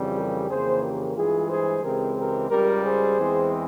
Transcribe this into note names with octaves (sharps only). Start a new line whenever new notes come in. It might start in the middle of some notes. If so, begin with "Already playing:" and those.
Already playing: F2 C#3 E3 G3 C4
G4 A#4
F2 C#3 E3 A#3 G#4 C5
G4 A#4
G2 E3 G#3 F4 G#4
G#4 C5
C#2 C#3 E3 G#3 C4 G4 A#4
G4 A#4
C#2 C#3 G3 G4 A#4
G#4 C5
E2 E3 G#3 C4